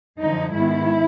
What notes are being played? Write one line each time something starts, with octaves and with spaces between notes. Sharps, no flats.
F#2 D3 F3 D#4
G#2 D#3 G#3 B3 E4